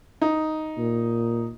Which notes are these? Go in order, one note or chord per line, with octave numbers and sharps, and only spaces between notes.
D#4
A#2